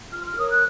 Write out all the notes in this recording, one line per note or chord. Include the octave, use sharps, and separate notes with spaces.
F4 F6
F6
A#4 C#5 D#6
F#6